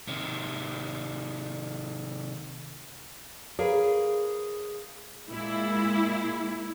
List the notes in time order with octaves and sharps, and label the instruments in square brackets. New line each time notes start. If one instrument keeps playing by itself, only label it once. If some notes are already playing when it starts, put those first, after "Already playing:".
[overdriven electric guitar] C3 D#3
[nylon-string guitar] G#4 A#4 B4 C#5 F5
[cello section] A#2 G#3 [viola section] E4